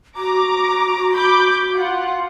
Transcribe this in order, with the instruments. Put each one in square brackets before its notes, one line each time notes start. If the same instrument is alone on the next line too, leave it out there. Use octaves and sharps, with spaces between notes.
[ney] F#4 [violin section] A#5 D6
[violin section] B5 D6 G6
F4 F#5